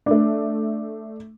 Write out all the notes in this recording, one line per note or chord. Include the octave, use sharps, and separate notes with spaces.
A3 D4